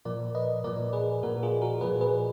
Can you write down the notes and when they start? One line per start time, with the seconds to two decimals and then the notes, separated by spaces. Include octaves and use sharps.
0.05 A#2 F3 A#4 D5
0.35 B4 D#5
0.64 A#2 F3 A#4 D5
0.93 G#4 B4
1.23 A#2 F3 F#4 A#4
1.43 F4 G#4
1.61 F#4 A#4
1.81 A#2 F3 G#4 B4
2.01 G#4 B4